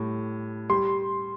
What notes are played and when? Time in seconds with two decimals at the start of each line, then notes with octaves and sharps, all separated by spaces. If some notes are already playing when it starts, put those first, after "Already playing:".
Already playing: A2 G3
0.70 G3 C6